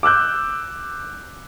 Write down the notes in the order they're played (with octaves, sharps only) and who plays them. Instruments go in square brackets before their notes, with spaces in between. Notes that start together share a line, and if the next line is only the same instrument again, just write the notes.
[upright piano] D6 E6 F#6 G6